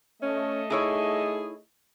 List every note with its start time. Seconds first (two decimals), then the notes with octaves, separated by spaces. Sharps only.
0.23 A3 C#4 D#5
0.70 D#4 E4 G#4 C#5